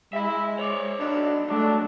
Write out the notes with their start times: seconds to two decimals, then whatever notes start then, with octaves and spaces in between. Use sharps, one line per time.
0.13 G#3 E5 B5
0.59 C#5 D5
1.00 B1 D4
1.49 F#3 G#3 A3 D4